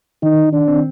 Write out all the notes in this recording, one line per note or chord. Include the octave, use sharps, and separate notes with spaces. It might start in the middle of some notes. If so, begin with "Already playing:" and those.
D#3 D#4
D4
C4